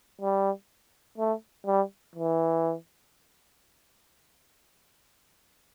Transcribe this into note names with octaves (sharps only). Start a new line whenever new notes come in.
G3
A3
G3
E3